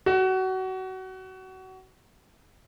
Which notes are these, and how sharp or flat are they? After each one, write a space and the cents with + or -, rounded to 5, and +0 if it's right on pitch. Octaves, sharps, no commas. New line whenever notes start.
F#4 +25